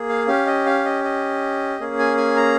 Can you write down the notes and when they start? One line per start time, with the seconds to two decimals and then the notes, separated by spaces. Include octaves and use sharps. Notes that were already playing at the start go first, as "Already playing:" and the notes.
Already playing: A#3 G#4
0.09 F5
0.28 C#4 G4 F5
0.46 D#5
0.66 F5
0.85 D#5
1.04 D#5
1.80 A#3 C#4 G#4
1.99 G#5
2.17 G#5
2.36 A#5